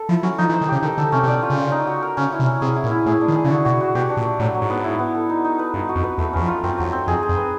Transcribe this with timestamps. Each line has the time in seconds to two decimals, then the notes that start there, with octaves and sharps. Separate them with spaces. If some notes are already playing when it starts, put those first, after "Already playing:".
Already playing: A4
0.09 F3 E4
0.23 F#3 C#4
0.38 F3 D#4
0.49 E3
0.53 C5
0.61 D#3
0.69 C#3 G4
0.83 D#3 A4
0.98 D3 A4
1.12 C3 C#4
1.23 C3
1.27 B2 D5
1.42 F4
1.50 C#3
1.58 F4
1.72 D#4
1.87 F#4
2.02 A#4
2.17 C#3 C#4
2.32 E4
2.39 C3
2.46 C#4
2.61 C3 G#4
2.76 E4
2.84 A#2
2.91 E4
3.06 A2 G#4
3.21 D4
3.28 D#3
3.36 G#4
3.44 C#3
3.50 D3 F#4
3.65 B2 F#4
3.81 F#4
3.95 B2 G4
4.10 D4
4.17 A#2
4.25 D4
4.40 A2 F#3
4.55 F#3
4.62 G#2
4.70 B3
4.84 E4
4.99 B3
5.15 A4
5.30 D#4
5.45 D#4
5.59 B4
5.74 G2 D#4
5.89 F#4
5.96 F2
6.03 B4
6.18 E2 A3
6.33 E2 C#4
6.41 F2
6.48 F4
6.63 F#2 C4
6.78 E2 F#3
6.85 F2
6.93 C4
7.07 F2 G#4
7.23 G#4
7.29 F2
7.37 B4